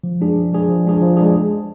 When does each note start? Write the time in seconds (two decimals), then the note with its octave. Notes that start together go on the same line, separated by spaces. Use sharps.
0.04 F3
0.21 G#3 D4 G#4
0.36 F3
0.52 G#3 D4 G#4
0.68 F3
0.85 G#3 D4 G#4
1.01 F3
1.17 G#3 D4 G#4